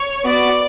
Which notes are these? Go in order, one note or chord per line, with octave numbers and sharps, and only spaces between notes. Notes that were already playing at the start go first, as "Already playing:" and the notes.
Already playing: C#5
B3 F#4 D5